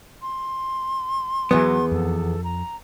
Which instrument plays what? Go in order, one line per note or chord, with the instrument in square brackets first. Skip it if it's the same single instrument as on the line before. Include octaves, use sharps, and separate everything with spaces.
[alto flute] C6
[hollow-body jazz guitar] E2 B3 [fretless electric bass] E3 F#3
[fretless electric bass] F2 [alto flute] A4
[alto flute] A#5